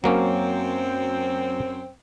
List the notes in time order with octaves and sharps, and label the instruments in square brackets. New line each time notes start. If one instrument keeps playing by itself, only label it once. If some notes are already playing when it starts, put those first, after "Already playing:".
[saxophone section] F#2 C4 [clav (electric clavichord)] F#3 A#3 C#4